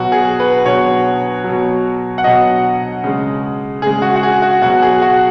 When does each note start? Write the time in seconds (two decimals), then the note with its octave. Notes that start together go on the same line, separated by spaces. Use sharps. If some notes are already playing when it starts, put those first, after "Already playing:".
Already playing: B2 F#3 F#4
0.12 G#4
0.40 B4
0.65 B2 F#3 C#5
1.44 B2 F#3
2.18 F#5
2.24 B2 F#3 D#5
3.04 C#3 G#3
3.82 C#3 G#3 G#4
4.02 F#4
4.16 F#4
4.23 G#4
4.42 F#4
4.61 B2 F#3 F#4
4.82 G#4
5.02 F#4